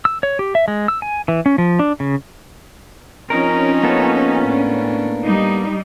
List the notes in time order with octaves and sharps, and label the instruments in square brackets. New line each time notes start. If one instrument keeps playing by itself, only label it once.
[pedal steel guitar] E6
C#5
G4
E5
G#3
E6
G#5
E3
C#4
F3
D4
C#3
[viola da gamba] F3 C4 D#4 [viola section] C#4 [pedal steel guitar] A#4
[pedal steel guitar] A#3 B3 A4
[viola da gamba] A2 D4
[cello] G3 [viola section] D#4